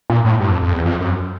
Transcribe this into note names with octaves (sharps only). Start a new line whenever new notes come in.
A#2
A2
G2
F2
F2
E2
F2
F#2